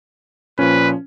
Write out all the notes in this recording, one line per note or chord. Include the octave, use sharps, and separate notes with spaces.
A#2 F3 C#4 B4